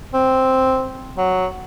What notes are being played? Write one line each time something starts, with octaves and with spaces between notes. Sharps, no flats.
C4
F#3